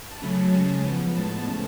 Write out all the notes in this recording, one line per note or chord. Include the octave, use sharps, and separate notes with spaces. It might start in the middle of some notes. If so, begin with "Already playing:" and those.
A5
C#3 F#3 A3 C#4 B5
A5
A5
C#3 G#3 C#4
F3 B3
A2 G#3 B3 A5
C#3 F3 A3 C#4